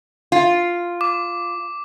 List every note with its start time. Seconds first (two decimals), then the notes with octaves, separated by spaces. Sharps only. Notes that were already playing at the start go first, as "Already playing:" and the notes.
0.32 F4
1.01 D6